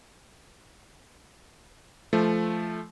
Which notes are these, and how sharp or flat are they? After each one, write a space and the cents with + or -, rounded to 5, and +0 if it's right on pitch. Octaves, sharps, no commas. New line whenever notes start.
F3 -20 A3 -15